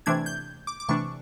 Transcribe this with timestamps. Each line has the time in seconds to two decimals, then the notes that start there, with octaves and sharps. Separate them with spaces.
0.06 C3 E3 A3 D4 G#6
0.26 G6
0.67 D6
0.80 D6
0.89 C3 E3 A3 D4 C#6